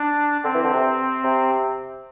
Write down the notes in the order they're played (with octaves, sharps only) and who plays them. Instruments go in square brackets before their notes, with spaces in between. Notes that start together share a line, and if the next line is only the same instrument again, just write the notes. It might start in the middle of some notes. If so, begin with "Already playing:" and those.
Already playing: [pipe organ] D4
[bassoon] D3 [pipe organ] C4
[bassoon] E3
D3
C3
C3